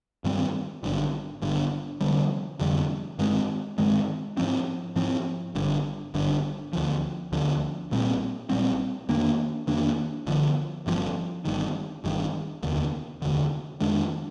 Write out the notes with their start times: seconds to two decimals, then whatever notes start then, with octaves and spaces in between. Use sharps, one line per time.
0.24 G2 D#3 G3 C4
0.83 G#1 G2 D3
1.42 G#1 G2 D3
2.01 F1 F2 D3 G3
2.60 F1 F2 D3 G3
3.19 G2 D#3 G#3 C4
3.78 G2 D#3 G#3 C4
4.37 G#2 F3 C4
4.96 G#2 F3 C4
5.55 G#1 G2 D3
6.14 G#1 G2 D3
6.73 D2 D3 F3
7.32 D2 D3 F3
7.91 A#1 A#2 G3 C4
8.50 A#1 A#2 G3 C4
9.08 F2 D#3 A#3 D4
9.67 F2 D#3 A#3 D4
10.27 G1 G2 D3 F3
10.86 G1 G2 D3 F3
11.45 G1 G2 D#3
12.04 G1 G2 D#3
12.63 F1 D#2 D3
13.22 F1 D#2 D3
13.81 F2 D#3 G#3 D4